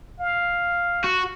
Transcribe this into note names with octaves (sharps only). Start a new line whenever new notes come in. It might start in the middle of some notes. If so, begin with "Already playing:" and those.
F5
F#4